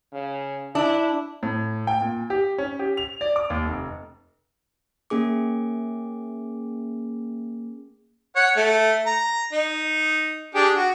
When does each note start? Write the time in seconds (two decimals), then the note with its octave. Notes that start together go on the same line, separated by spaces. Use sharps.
0.13 C#3
0.75 D4 E4
1.43 A2
1.87 G5
2.01 A#2
2.30 G4
2.58 C#4
2.79 G4
2.97 F7
3.21 D5
3.36 D6
3.50 D#2
3.65 F1
5.10 A#3 C#4 G#4 D6
8.36 C#5 F#5
8.56 A3
9.06 A#5
9.53 D#4
10.55 D4 G4 G#4
10.75 F#4